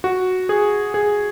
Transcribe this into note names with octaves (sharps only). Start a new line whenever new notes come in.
F#4
G#4
G#4